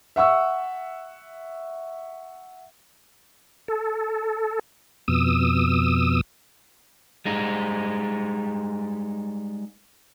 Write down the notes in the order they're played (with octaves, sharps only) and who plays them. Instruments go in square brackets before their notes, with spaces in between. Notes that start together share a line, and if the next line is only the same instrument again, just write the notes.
[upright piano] E5 F#5 C#6 E6
[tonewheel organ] A4
F2 B2 D#6 E6
[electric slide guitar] G3 G#3 D#4